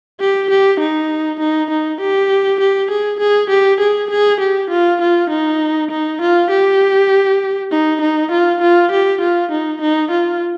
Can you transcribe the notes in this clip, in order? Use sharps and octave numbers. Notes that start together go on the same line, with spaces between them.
G4
G4
D#4
D#4
D#4
G4
G4
G#4
G#4
G4
G#4
G#4
G4
F4
F4
D#4
D#4
F4
G4
D#4
D#4
F4
F4
G4
F4
D#4
D#4
F4